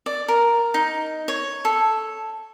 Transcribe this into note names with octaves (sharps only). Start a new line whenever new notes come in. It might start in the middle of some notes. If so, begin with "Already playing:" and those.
D5
A#4
D#4
C#5
A4